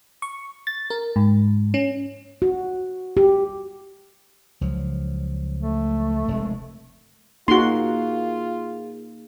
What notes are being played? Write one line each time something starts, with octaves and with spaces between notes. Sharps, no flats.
C#6
A6
A#4
G#2
C#4
F#4
G4
C#2 F3 F#3
A3
F1 G#3
A#3 D#4 F4 F#4 G#4 C6